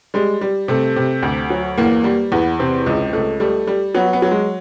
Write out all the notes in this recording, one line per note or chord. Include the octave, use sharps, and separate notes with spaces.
G3 G#3
G3
C3 A3
C3
D2
F#3
E2 A#3
G3
E2 B3
C3 C4
C#2
C#2 A3
G3 A3
G3
F#3 B3
B3
F#3
G#3